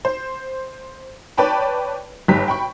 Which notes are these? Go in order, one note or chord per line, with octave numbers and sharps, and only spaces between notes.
C5
B4 C#5 D5 G5 A5 B5
G1 G#2 G4 A#5 B6
G5 B5 C#6